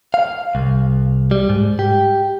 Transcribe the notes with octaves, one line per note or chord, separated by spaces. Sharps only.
F5
C2
G3
G#2
G4